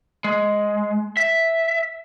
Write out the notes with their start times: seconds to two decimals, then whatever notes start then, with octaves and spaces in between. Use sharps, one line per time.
0.24 G#3
1.17 E5